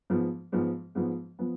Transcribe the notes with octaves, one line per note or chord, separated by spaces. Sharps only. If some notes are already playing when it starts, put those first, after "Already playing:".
G#2 F3 B3
G#2 F3 B3
G#2 F3 B3
F3 B3